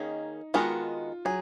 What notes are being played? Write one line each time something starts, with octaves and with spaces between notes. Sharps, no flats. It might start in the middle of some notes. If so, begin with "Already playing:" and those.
Already playing: D#3 A#3 C#4 D#4 G#4
D#3 G#3 B3 F4 F#4 A#4
F#3 G#4